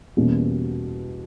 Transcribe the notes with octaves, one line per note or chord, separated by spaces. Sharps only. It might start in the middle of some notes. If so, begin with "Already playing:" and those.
E2 B2 G3 A#3 C#4